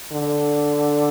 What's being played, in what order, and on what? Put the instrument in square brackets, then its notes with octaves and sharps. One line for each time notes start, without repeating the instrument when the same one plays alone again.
[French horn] D3